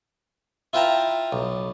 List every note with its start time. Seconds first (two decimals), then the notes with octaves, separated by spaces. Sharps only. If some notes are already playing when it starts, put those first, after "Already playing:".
0.73 E4 F4 B4 G5 A5 A#5
1.32 B1